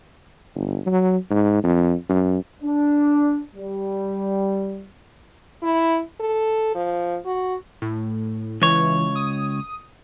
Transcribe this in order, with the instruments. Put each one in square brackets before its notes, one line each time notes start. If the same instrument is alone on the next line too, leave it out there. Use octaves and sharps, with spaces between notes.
[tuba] G1
F#3
G#2
F2
F#2
[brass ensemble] D4
G3
[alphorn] E4
A4
F3
F#4
[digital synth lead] A2
[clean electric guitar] C#2 C#5 [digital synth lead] E3
[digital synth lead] D#6